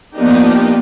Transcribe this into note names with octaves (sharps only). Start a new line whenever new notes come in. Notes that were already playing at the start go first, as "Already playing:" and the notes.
F3 A#3 B3 D4 D#4 G4